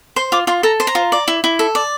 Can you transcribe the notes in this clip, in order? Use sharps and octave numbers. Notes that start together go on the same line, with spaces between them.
C5 C6
F4 D6
F4 C6
A4 A#5
C5
A#5
F4
D5
E4
E4
A4
D5